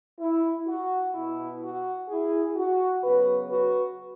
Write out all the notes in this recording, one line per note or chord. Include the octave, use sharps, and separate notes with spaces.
E4
F#4
B2 B3 E4
F#4
E4 G#4
F#4
C#3 F#3 B3 F#4 B4
F#4 B4